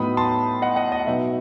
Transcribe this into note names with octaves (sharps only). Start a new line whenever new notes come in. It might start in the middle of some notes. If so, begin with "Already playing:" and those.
Already playing: A2 F#3 B3 D#4 B5 D#6
A5 C6
D#5 F#5
D#5 F#5
D#5
B2 F#3 B3 D#4 E5